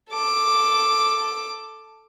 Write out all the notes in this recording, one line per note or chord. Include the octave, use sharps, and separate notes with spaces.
A4 D6